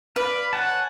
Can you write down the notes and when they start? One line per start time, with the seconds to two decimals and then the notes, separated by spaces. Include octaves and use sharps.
0.16 B4 D5 F5 B5
0.53 C#5 F#5 G#5 A5